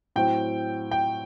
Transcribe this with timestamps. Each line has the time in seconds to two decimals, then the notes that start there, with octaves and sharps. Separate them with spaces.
0.16 A2 F#3 C4 G5
0.91 G5